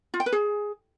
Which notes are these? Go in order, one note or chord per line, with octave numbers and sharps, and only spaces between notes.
F4
G5
B4
G#4